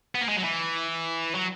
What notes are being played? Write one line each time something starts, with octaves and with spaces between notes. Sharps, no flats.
B3
A#3
G#3
F#3
E3
F#3